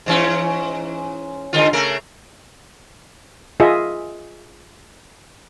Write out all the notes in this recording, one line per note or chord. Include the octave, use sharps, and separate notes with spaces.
G#2 E3 C#4
G#2 D3 F4
C#3 A3 A#4
F4 G#4 D#5 E5